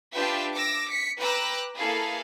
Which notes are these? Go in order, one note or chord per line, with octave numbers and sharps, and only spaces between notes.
D4 F4 G4 B4 E5 G5
D6 E6 A#6
B6 C#7
B4 G5 A#5 D6 E6 F#6
A#3 E4 G#4 A4 B4 F5